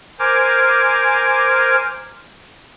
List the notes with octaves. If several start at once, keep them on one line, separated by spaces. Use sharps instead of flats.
A#4 C5 G#5 D6 F6